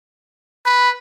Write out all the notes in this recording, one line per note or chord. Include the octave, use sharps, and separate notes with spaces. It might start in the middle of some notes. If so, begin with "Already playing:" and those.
B4 B5